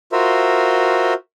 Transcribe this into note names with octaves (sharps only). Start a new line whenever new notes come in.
F4 F#4 A#4 C5 E5